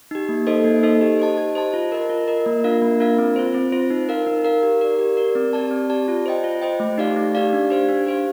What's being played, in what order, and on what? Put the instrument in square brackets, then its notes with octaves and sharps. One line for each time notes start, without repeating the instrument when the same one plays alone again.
[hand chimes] D#4 G4
A#3
D#4 A4 C5 D#5
A#3
D#4 A4 C5 D#5
G4
C5 D#5 A5
G4
C5 D#5 A5
F4
A#4 D#5
F4
A#4 D#5
A#3
D4 F4 A#4 F5
A#3
D4 F4 A#4 F5
C4
F4 C5
C4
F4 C5
D#4
A#4 F5
D#4
A#4 F5
G4
A#4 D5
G4
A#4 D5
C4
G4 D5 A5
C4
G4 D5 A5
F4
C5 D#5 G5
F4
C5 D#5 G5
A3
D#4 G4 D5 F5
A3
D#4 G4 D5 F5
D4
G4 C5 F5
D4
G4 C5 F5